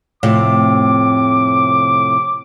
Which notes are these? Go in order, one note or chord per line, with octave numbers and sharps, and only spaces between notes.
F2 A2 C3 D6